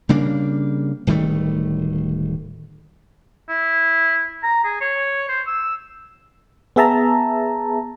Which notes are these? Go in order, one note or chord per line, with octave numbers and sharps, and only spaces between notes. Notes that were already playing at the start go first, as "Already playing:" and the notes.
C#3 G3 A#3 D4
D1 D#3 G3 A3
E4
A#5
G#4
C#5
C5
E6
B3 G#4 E5 A5 A#5